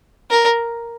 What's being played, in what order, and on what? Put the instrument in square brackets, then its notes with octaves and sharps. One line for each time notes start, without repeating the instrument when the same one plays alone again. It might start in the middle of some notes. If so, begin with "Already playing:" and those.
[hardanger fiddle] A#4